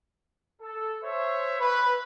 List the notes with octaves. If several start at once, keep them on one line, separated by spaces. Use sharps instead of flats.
A4
C5 C#5 E5
B4